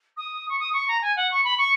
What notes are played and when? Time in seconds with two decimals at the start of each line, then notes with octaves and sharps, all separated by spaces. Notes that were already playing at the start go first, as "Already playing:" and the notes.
0.16 D#6
0.49 C#6
0.59 D#6
0.73 C#6
0.88 A#5
1.01 G#5
1.16 F#5
1.31 C#6
1.44 B5
1.57 C#6